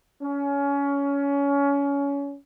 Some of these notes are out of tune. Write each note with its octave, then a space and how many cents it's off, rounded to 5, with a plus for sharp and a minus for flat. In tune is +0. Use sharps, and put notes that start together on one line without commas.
C#4 +25